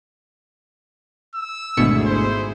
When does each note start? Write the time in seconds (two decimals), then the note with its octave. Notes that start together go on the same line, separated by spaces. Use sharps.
1.35 E6
1.77 G#1 D2 G#2 B2 E4 G#4 C#7
2.06 C5